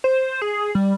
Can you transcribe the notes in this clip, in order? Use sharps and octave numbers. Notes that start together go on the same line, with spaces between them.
C5
G#4
G3